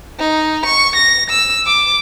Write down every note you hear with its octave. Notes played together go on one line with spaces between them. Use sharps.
D#4
C#6
A#6
E6
D6